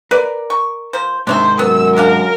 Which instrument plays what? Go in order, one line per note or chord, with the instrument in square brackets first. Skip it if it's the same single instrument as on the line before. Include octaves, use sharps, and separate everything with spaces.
[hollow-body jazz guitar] A#4 D5 [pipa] B4
[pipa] C#6
F3 C5
[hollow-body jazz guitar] G#2 C3 D#3 [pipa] D4 C#5 E5 [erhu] C5
[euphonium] F#2 [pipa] B3 [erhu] E6
[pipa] G#3 D4 F5 [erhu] A#4